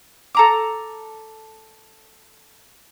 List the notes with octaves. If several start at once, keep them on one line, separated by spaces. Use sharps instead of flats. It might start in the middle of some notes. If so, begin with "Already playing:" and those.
A4 A#5 D6